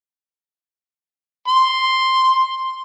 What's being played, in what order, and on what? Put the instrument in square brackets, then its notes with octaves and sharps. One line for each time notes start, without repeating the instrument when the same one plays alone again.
[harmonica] C6